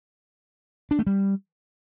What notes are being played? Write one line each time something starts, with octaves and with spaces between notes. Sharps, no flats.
D4
A3
G3